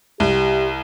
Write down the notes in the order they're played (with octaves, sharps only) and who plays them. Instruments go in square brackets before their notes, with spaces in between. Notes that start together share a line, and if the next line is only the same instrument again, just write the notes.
[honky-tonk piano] C2 [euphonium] G4